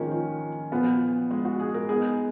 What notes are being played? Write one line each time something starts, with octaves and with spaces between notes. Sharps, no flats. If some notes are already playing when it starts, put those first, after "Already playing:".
Already playing: D#3 F3 G#3 A#3 C#4
F3
A#2 F3 B3 F4
G#3
F#4
G#4
A#4
G#3 B3 D#4 G#4 A#4